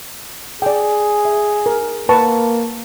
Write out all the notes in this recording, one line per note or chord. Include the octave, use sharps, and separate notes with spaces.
G#4 D5 G5
E5
A#4
A#3 B4 A5 C#6